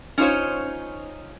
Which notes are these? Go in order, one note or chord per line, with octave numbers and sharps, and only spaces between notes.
C#4 D#4 F4 C5 C#5